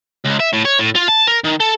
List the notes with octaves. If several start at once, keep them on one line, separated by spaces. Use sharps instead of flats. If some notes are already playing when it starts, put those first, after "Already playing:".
C#2
E5
A2
C#5
A2
F4
A5
A#4
D#3
A4